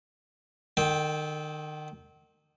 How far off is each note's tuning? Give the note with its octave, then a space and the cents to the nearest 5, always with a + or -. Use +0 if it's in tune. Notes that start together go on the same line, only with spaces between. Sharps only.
D#3 -35 A4 -35 G5 +0